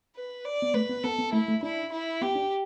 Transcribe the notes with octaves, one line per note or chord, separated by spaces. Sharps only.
B4
D5
B3
A3 B4
B3
B3 A4
B3
A3 E4
A3
D4 E4
E4
B3 G4
D4